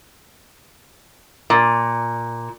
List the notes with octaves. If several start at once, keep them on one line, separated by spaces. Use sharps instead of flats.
A#2